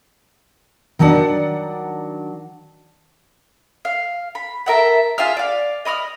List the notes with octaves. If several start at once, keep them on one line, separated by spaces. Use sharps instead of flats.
D#3 F#3 D4 D5 F#5
F5
B5
A4 A#4 E5 F#5
F4 G#4 E5 F6
D5 F5
D#5 B5 D6 F6